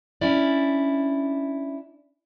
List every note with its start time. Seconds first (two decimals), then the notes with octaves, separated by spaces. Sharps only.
0.21 C#4 D4 E4 D5